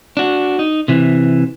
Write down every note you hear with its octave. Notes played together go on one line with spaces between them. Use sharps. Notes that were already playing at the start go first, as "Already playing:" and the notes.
D4 F#4
D#4
C3 E3